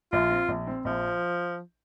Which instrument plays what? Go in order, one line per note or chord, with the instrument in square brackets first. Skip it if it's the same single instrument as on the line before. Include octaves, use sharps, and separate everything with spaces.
[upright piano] A#1 [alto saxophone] F4
[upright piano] C4
A#1
C4
[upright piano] A#1 [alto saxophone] F3